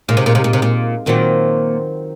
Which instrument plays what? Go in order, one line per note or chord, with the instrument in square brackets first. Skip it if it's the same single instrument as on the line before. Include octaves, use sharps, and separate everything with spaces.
[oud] A#2 [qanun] G#3 D#4 A#4
[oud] C3
A#2
C3
A#2
C3
A#2
[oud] A#2 [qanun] D#3 F#3 C4